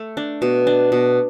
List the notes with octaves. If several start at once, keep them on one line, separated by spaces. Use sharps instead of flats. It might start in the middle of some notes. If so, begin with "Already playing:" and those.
Already playing: A3
D4
B2
D4
B2